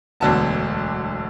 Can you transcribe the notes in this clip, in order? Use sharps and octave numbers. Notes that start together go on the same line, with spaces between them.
E1 D2 D3 F#3 B3 A5